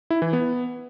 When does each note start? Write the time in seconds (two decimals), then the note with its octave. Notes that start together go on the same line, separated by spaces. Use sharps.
0.10 E4
0.22 E3
0.33 B3